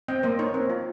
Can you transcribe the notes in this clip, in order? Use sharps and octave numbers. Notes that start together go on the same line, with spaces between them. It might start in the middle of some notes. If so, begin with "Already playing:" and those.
C4 D#5 G5
A#3 C5 D#5
D#4 A#4 C#5
C4
F4